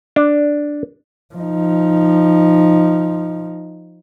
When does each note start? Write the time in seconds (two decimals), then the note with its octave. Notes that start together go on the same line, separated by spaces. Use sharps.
0.16 D4
1.35 F3 D#4